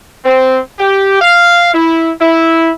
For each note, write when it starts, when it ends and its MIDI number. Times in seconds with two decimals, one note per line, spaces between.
0.25 0.59 60
0.79 1.18 67
1.21 1.73 77
1.74 2.11 64
2.21 2.70 64